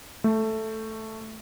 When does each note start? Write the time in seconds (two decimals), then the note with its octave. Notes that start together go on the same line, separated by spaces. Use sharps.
0.24 A3